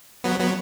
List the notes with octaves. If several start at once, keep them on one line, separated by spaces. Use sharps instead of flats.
F#3 B3
F#3 B3